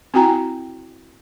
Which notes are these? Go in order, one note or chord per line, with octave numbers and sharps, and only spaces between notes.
C4 E4 F#4 G5 G#5 A#5